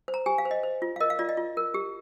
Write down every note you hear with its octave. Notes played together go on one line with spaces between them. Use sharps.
C5
A#5
G4 G#5
F5
C5
D#5
C5
F4
F5
A#4 D#5
F5
F4 D5
D#5
F4
A#4
G4